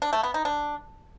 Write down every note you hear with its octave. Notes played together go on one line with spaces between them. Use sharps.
D4
A3
B3
D#4
D4